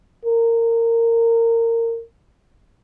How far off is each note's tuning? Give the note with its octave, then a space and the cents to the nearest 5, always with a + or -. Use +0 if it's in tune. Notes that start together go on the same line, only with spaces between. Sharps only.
A#4 -20